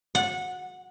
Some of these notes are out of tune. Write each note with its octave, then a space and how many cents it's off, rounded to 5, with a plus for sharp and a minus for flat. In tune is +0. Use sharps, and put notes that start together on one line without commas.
F#5 -20